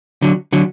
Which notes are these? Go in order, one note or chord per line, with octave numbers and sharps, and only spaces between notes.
D3 F#3
D3 F#3